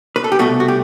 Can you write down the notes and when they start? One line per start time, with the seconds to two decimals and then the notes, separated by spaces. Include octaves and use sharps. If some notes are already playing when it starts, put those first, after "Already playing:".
0.16 B4
0.24 A4
0.32 G4
0.39 C2 B2 A3 F#4
0.60 F#4
0.68 G4